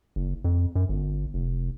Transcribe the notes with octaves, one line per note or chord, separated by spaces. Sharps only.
F#1
F2
F#2
G1
F1